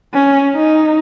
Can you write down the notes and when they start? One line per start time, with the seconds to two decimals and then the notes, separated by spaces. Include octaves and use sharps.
0.14 C#4
0.55 D#4